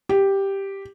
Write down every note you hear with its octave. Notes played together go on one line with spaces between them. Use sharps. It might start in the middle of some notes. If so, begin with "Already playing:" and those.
G4